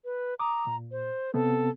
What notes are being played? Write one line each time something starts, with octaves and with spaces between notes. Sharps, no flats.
B4
A#5 D6 D#6
A#2
C5
C3 B3 C4 A4